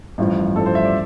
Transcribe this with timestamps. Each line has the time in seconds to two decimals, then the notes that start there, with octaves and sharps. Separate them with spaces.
0.18 A1 G2 F3
0.56 A1 G2 F3 A4
0.66 C5
0.75 E5
0.85 D5